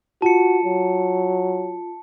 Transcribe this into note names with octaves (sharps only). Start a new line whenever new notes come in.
F4 F#4 A5 C#7
F#3